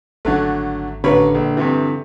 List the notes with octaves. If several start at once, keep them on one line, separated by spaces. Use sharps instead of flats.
G#1 D3 F#3 A3
A1 D3 B4 C#5 B5
A#1
G2 C3 E3